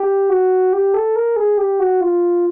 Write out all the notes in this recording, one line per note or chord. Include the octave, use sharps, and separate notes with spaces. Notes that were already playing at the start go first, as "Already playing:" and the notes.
Already playing: G4
F#4
G4
A4
A#4
G#4
G4
F#4
F4